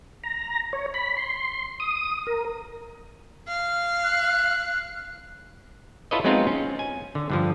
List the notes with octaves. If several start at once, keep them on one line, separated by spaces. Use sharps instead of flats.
A#5
C#5
B5
C6
D#6
A#4
F5
F#6
E4 F4 A4 B4 C#5 D#5
F#3 G#3 B3 C4 D#4 F4
C#4
G#5
D3
G2 D3 F3